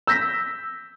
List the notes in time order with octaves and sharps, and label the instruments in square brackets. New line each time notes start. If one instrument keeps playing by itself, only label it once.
[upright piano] E6 G6 A#6 B6